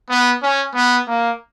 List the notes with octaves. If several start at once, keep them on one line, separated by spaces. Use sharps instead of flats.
B3
C#4
B3
A#3